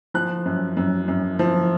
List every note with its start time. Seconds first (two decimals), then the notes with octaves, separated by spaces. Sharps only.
0.14 F3 F#6
0.46 F#2
0.77 F#2
1.08 F#2
1.39 F3